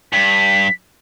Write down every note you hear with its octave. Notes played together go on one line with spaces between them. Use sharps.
G2 B6